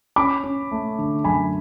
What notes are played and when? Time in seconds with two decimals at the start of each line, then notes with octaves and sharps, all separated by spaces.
0.16 C#4 B5 D6
0.43 C#4
0.72 A3
0.99 D3
1.24 F#2 G#5 B5